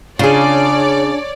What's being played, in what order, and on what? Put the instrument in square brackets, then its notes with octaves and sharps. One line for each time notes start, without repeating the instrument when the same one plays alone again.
[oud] C#3 [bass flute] D4 [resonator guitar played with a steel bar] F4 G#4 [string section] C#5 D5